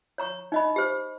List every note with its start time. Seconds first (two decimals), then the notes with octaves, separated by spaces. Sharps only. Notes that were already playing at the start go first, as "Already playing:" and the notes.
0.18 C#5 A#5 C#6
0.52 D#4 D#5 B5
0.76 G4 C5